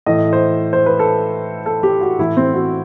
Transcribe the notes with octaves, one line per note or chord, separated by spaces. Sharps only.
A2 E3 D#5
C5
C5
B4
A4
A4
G4
F#4
A2 E3 E4
C4
F#4